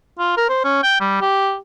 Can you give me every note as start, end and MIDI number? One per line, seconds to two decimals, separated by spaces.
0.19 0.35 65
0.37 0.46 70
0.49 0.60 72
0.64 0.79 61
0.83 0.98 79
1.01 1.19 55
1.21 1.56 67